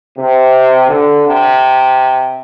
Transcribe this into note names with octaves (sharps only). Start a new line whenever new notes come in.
C3
D3
C3